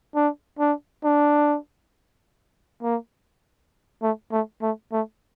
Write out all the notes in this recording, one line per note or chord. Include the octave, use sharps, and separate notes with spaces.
D4
D4
D4
A#3
A3
A3
A3
A3